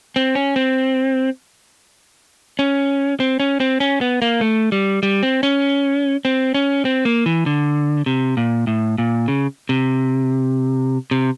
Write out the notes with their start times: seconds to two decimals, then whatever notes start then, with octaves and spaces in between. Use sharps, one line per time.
0.16 C4
0.35 C#4
0.56 C4
2.59 C#4
3.20 C4
3.40 C#4
3.60 C4
3.80 C#4
4.01 B3
4.22 A#3
4.41 A3
4.72 G3
5.03 G3
5.23 C4
5.43 C#4
6.25 C4
6.54 C#4
6.85 C4
7.05 A#3
7.26 E3
7.46 D3
8.06 C3
8.37 A#2
8.67 A2
8.98 A#2
9.28 C#3
9.69 C3
11.11 C3